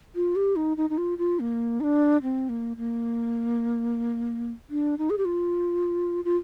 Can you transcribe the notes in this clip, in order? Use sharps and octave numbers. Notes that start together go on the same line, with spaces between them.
F4
G4
D#4
D#4
D#4
F4
F4
A#3
D#4
D4
C4
A#3
A#3
D4
D#4
G#4
G4
F4
F4